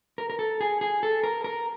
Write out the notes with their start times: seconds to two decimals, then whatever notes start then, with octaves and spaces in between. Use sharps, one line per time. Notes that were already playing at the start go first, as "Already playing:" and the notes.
0.18 A#4
0.30 A#4
0.39 A4
0.61 G#4
0.81 G#4
1.03 A4
1.24 A#4
1.44 A#4